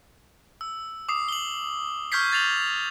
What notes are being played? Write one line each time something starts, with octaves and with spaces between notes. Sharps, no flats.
E6
D6 D#6 C7
F#7 G7
C#6 F6 G6 G#6 B6 C7
G#6 A6 C7 F7 F#7
F7